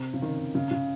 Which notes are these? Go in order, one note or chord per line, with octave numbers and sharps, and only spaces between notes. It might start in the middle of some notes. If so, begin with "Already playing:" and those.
Already playing: C3
C#3
D#3
C#3
C#3